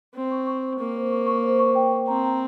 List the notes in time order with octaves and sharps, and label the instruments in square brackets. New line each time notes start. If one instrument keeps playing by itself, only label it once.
[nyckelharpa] C4 [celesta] C5
[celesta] C#6
C#6
C5
[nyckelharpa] A#3 [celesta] C#6
[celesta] C5
C#6
C#6
C5
C#6
G5
C5
[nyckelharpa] C4 [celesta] A#5
[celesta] A#5